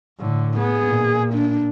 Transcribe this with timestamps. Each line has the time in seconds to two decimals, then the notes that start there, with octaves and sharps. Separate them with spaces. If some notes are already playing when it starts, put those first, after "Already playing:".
0.18 A2 D3
0.58 B3 G#4
0.88 A#2
1.34 D4